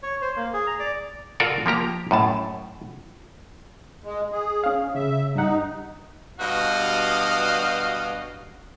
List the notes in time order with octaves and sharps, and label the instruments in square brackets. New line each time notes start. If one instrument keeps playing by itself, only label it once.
[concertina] C#5
C5
A#3
G#4
A#5
D5
[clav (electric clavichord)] F4 F#4 A4 A#4 D5
F3 A#3 G4 A#5
F#2 A2 A5
[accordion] G#3
G#4
[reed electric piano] C#4 F5
[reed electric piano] C#3 [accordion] E5
[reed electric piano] G2 F#5 [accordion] D#4
[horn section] G2 B2 F#4 D#5 F5